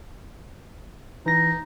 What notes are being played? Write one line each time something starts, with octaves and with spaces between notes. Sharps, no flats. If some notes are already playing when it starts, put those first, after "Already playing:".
E3 D#4 A#6